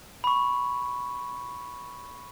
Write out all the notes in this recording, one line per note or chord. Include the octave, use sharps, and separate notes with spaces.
B5 C#6